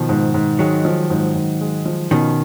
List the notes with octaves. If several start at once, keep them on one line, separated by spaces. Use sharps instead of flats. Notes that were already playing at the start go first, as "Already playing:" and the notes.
Already playing: B2 D#3 F3
G#2
G#2
D#3 F#3 G#3
F3
G#2
G#2
G#3
F3
B2 D#3 C#4